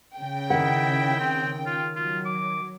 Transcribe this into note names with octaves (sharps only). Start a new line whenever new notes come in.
C#3 G5
D#3 E4 F#5
C4
F4
F#3 F4
D6